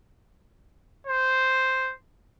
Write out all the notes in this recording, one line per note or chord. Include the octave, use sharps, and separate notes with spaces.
C5